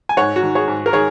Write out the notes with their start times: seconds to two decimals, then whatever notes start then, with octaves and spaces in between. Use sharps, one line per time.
0.09 G#5
0.17 G#2 C#5 F#5
0.36 F#4
0.43 D#3
0.55 G#4 C#5
0.68 G#2
0.86 A#4
0.93 D#3 G#4 C#5